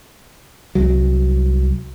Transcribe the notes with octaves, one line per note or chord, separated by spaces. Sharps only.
C2 F#3